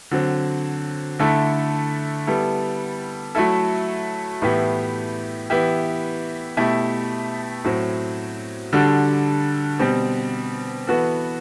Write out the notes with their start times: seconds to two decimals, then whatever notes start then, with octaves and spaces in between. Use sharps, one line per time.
0.11 D3 F#3 C4
1.19 D3 A3 E4 A4
2.27 G3 B3 E4 A4
3.35 F#3 A3 E4 A4
4.42 A2 E3 B3 E4 G4
5.50 E3 B3 E4 G4
6.57 B2 A3 E4 G4
7.64 A2 F#3 C4
8.73 D3 G3 D4 F#4 A4
9.79 B2 G3 C4 G4
10.87 E3 B3 F#4 A4